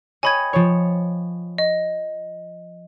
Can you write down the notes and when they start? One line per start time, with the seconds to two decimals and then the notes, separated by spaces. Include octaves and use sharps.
0.23 C#5 D#5 G5 G#5 B5 G#6
0.53 F3 C#5
1.58 D#5